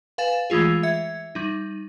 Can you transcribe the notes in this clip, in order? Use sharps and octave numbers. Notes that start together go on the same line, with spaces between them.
B4 F5 G#5 A6 E7
E3 G#3 A3 F4 G#4
E5 G#6 C#7
G3 D#4